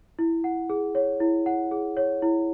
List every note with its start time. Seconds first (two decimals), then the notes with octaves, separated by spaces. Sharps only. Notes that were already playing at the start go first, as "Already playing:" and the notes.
0.19 E4
0.44 F#5
0.70 G#4
0.95 C#5
1.20 E4
1.46 F#5
1.71 G#4
1.97 C#5
2.22 E4